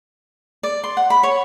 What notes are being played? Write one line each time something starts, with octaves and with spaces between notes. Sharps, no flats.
D5
C6
F#5
B5
C#5